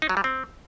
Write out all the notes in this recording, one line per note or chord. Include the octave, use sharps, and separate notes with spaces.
D#4
F#3
G3
C4